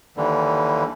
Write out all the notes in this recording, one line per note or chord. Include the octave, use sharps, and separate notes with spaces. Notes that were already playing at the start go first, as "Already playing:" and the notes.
D#2 D3 E3 G3